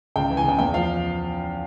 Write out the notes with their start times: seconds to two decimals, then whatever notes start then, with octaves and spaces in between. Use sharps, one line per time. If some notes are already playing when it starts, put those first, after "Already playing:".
0.16 C#2 G5
0.30 E3
0.37 G#5
0.44 C#3 G5
0.59 E2 G5
0.74 F3 F5